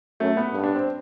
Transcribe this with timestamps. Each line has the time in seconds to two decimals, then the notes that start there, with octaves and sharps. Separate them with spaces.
0.20 F#2 A3
0.37 B3
0.53 G2
0.64 D4
0.75 C4